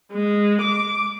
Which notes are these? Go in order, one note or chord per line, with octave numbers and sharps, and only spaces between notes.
G#3
D6